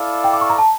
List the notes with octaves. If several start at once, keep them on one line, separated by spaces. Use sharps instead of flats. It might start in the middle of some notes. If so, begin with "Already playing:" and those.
Already playing: E4 A4 D5 F5
G5
D6
C#6
A#5
A5